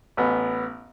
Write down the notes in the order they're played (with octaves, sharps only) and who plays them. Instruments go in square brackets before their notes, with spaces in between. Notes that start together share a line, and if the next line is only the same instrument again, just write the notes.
[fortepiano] A1 B3